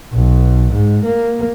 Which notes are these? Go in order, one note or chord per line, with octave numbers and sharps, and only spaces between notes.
B1
G#2
A#3